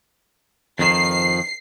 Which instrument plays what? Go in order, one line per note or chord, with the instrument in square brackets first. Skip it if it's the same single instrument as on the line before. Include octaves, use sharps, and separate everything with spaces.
[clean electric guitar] F2 D#3 F3 [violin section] C7